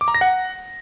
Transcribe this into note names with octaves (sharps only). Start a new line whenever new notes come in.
D6
A#5
A#6
F#5